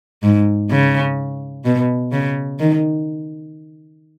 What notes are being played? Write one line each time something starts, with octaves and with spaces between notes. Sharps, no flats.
G#2
C#3
B2
C#3
D#3